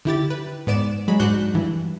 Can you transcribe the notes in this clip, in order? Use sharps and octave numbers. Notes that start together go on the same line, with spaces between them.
D3 E4 G4 A6
B4
G#2 B3 D5 E7
F#3 G#3 B5
G#2 D4 F#4 F#6 G6
G2 E3